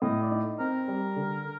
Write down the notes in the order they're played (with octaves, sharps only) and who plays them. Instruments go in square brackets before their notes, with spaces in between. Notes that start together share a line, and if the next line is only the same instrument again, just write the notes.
[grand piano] A2 [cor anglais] D#5
[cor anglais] D5
[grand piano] D#4
[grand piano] C4 [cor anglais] A#4
[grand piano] G3
D3